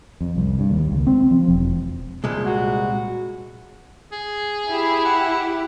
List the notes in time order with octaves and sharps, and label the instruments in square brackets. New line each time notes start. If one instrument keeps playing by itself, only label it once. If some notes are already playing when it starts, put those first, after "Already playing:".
[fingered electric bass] F2
C2
G2
D#2
C#2
C4
F3
E1
[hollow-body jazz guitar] C2 A#2 G#3
[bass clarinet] F#4
[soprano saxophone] G#4
[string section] E4 G4
[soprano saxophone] F#5